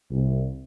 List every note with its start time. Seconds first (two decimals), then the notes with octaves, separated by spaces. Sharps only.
0.11 C2